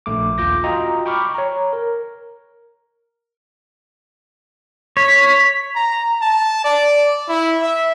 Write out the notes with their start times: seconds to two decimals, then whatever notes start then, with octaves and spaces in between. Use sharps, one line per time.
0.06 A#1 A3 D6
0.38 D#2 F4 D6 G6 A#6
0.64 F4 F#4 D#5 G5 A#5
1.06 G5 B5 C#6 D6 F6
1.34 C#5 A#5
1.73 A#4
4.97 C#5 B6
5.76 A#5
6.22 A5
6.64 D5
7.29 E4
7.62 E5